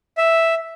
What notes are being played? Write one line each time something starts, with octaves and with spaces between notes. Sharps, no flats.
E5